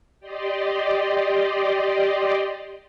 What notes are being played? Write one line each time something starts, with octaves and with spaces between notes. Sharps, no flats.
G4 D5 D#5 C6